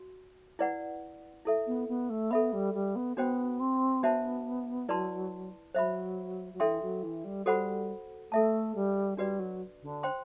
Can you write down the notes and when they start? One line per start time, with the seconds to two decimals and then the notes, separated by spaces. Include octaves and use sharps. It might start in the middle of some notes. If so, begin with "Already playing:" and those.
Already playing: F#4
0.59 E4 B4 D5 F#5
1.45 E4 A4 E5
1.66 B3
1.88 B3
2.09 A3
2.31 B3 A4 E5 B5
2.52 G3
2.74 G3
2.95 B3
3.17 B3 D4 F#4 C5 G5
3.60 C4
4.02 B3 D4 F#4 C5 E5 A5
4.88 F#3 E4 B4 D5 A5 C6
5.75 F#3 C5 E5 B5
6.53 F#3
6.60 E3 D4 A4 E5 G5 C6
6.81 F#3
7.03 E3
7.24 G3
7.46 G3 F#4 A4 C5 F#5 B5
8.31 A3 A4 E5 A5
8.75 G3
9.17 G3 D4 F#4 B4 D5
9.39 F#3
9.82 D3
10.03 C5 G5 C6